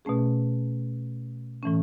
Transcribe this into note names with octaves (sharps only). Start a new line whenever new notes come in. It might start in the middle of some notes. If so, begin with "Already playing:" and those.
B2 A3 C#4 G#4
A2 E3 A3 C#4